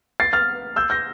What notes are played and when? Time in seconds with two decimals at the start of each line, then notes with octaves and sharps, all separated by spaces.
0.20 A6 C7
0.33 F6 A6
0.76 E6 G6
0.90 G6 A#6